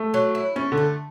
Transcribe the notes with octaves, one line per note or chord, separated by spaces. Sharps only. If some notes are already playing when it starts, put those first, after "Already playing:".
Already playing: A3
F#3
E4
A3 C#4
D3
A3